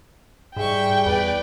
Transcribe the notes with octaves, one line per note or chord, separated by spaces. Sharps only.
G#2 G3 G4 G#4 E5 G5 C#6
E2 B4 D5